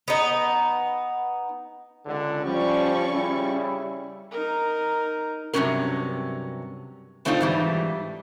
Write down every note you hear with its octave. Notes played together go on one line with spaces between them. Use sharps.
B3 D#4
C#2 D3
F3 G3 C#4 D5 C#6
C#3 G3 E4
D#4 A#4
G2 C3 D#3 F#3 C#4 A#4
B2 A3 C4 D4 D#4 F4
G#2 E3 G3